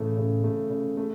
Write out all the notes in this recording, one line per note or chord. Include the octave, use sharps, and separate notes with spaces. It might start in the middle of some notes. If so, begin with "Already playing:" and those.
Already playing: A2 C#3 E3 A3
C#3
A3
C#3
A3